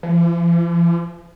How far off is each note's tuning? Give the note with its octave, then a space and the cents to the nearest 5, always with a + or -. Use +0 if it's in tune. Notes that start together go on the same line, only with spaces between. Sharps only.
F3 -45